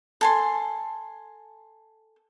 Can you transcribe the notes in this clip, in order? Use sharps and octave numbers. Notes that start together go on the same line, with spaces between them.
A4 G#5 C6